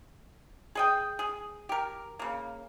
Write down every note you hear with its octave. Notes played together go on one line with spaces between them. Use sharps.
G#4 D#5 G5
G#4
G4 A#4
C#3 A#3